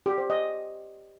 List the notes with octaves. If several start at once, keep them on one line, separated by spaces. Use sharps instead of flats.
G4
C5
D#5